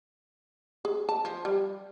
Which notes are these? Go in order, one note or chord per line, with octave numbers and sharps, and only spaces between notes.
G#4
A5
F3
G3